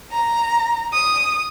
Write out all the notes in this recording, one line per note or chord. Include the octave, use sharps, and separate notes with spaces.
A#5
D#6